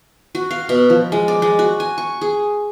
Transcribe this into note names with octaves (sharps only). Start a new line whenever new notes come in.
F#4
F5
B2
F3
G#3
D5
G#3
F#4
G#5
C#6
G#4